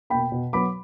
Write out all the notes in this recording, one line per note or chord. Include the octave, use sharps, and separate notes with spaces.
B2 A#3 G5 B5
B2
F#3 B3 B5 D6